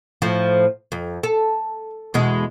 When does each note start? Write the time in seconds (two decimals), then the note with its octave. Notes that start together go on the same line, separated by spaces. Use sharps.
0.22 A2 F3
0.92 F2
1.23 A4
2.14 E2 B2 G#3